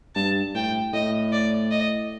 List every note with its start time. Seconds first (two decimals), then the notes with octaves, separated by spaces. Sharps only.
0.15 G2 A5
0.54 A2 G5
0.93 A2 D#5
1.32 D5
1.71 D#5